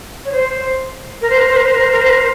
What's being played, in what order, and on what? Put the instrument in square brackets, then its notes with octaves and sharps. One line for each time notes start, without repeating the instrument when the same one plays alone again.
[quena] C#5
C5
A#4
C5
A#4
C5
A#4
C5
A#4
C5
A#4
C5
A#4
C5